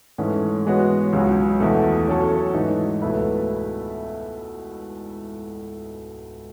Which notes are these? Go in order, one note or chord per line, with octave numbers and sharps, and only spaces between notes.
G#2 E3 A3 C#4
E3 G#3 B3 F#4 C#5
C#2 C#3 F#3
E2 B2 A3
F#3 C#4 F#4 A4 C#5
G#2 E3 A3 D#4
C#2 B2 A3 E4 B4